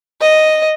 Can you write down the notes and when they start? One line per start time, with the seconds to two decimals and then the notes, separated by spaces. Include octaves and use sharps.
0.21 D#5